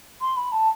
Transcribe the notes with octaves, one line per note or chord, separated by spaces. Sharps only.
C6
B5
A5